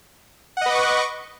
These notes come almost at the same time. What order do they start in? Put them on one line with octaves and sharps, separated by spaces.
F#5 D#5 B4 D6 C#6